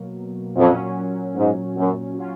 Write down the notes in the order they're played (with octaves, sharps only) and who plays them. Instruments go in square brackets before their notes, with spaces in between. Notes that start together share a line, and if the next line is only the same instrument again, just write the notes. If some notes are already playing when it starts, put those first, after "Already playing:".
Already playing: [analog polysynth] B2 F#3 A#3
[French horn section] F2 [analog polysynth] A#2 F#3 C#4
[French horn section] G#2
F#2
[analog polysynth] F#3 C#4 F4